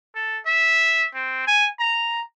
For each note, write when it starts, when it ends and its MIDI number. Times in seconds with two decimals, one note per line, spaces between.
0.15 0.39 69
0.46 1.06 76
1.15 1.43 60
1.47 1.68 80
1.80 2.21 82